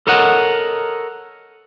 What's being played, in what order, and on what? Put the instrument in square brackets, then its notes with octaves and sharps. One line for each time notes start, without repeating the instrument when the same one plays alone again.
[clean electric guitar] A4 A#4 C#5 D#5 F#5